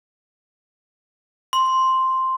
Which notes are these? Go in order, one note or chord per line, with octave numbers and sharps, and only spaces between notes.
C6